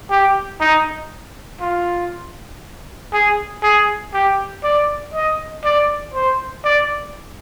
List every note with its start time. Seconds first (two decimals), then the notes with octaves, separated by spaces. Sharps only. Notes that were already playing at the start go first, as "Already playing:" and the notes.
0.10 G4
0.60 D#4
1.61 F4
3.13 G#4
3.63 G#4
4.14 G4
4.64 D5
5.14 D#5
5.64 D5
6.14 C5
6.65 D5